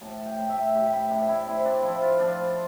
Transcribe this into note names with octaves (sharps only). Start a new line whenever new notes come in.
A2 A5
G5
A2
E5
A2 G4
E4
A2 D4
E4
C4 E4
D4
F3 E4
F4
F3 D4